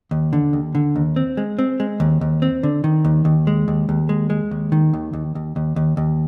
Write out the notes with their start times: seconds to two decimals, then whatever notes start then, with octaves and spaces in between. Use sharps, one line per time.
0.11 D#2
0.33 D3
0.53 D#2
0.75 D3
0.96 D#2
1.16 C4
1.37 G#3
1.59 C4
1.80 G#3
2.00 D#2
2.21 D#2
2.42 C4
2.63 D3
2.84 D#3
3.05 D#2
3.25 D#2
3.47 G#3
3.68 D#2
3.89 D#2
4.09 G#3
4.30 G#3
4.51 D#2
4.72 D#3
4.94 D#2
5.13 D#2
5.35 D#2
5.56 D#2
5.76 D#2
5.97 D#2